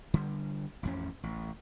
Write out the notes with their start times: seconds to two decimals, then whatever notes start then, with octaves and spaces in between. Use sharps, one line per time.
0.14 D3 G3
0.83 A1 F2 C#4
1.23 A1